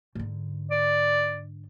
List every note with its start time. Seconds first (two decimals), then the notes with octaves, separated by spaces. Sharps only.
0.15 G#2 D3
0.71 D5